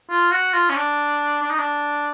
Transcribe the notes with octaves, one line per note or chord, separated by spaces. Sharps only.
F4
F#4
F4
C#4
D4
D4
D#4
D4